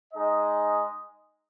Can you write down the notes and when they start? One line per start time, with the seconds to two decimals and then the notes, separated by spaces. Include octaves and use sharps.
0.13 G#3 D#4 G#4 D#5